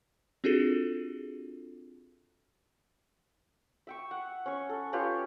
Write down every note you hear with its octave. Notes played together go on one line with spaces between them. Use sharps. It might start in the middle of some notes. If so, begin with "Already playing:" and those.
C4 D4 F4 F#4 G#4 A4
E5 G5 C#6
F#5
C#4 C#6
A4
C#4 F4 G4 B4